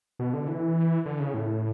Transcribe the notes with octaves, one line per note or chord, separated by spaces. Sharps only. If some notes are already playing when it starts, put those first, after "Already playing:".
B2
D3
E3
D3
C#3
A2